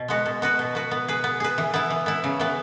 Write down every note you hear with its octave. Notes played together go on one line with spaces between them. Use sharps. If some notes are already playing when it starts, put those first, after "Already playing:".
Already playing: B2
G#3 B3 F#4
B2
B3 F#4 B4
B2
B3 F#4 B4
B3
G#4 B4
B3
G#4 B4
E3
B3 E4
E3
B3 E4
C#3
E3 B3